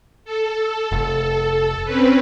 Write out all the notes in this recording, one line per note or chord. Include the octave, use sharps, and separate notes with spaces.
A4
F1
C4 C#4 B4